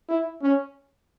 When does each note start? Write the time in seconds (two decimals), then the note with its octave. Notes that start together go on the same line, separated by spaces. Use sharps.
0.09 E4
0.42 C#4